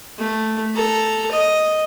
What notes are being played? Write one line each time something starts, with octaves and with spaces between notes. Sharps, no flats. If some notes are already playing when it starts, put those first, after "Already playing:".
A3
A4 A#5
D#5